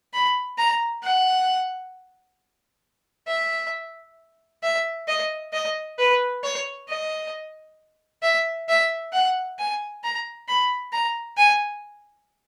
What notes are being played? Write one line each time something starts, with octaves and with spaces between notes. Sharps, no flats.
B5
A#5
F#5
E5
E5
D#5
D#5
B4
C#5
D#5
E5
E5
F#5
G#5
A#5
B5
A#5
G#5